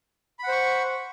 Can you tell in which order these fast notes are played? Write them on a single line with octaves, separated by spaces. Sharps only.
B5 F#5 C5 C#6